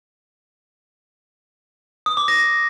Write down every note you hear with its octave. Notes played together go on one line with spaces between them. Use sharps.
D#6
D6
A#6